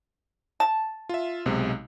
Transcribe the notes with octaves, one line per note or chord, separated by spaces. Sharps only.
A5
F4 E5
B1 C3 G#3